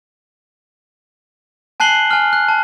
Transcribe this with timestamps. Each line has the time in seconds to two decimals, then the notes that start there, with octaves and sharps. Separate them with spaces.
1.80 G#5 A5 F#6 C7 F#7 G7
2.11 G#5 F6
2.33 F#6
2.48 A5